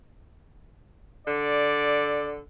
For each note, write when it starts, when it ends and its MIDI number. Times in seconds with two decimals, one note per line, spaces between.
1.27 2.41 50
1.27 2.32 74